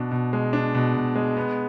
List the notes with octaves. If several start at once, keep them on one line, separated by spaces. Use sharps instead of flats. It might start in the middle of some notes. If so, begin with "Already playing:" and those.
Already playing: B2 D4
B2
G#3
D4
B2
B2
G#3
B3